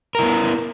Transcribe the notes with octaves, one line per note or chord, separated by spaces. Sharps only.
B3 E4 A#4